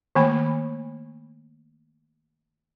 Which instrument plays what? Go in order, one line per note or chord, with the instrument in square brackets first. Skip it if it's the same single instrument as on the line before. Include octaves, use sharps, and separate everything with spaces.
[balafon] D#3 A3 A#3 B5